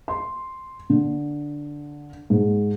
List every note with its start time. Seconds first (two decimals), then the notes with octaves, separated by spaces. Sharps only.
0.08 C6
0.90 D3
2.30 G#2